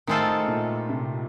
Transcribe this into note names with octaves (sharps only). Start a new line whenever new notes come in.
A2 D#3 G#3 C4 F4 A4
A#2
C3